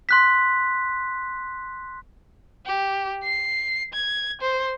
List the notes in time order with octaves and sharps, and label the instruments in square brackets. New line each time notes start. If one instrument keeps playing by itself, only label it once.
[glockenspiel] C6 F#6 B6
[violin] G4
C7
G#6
C5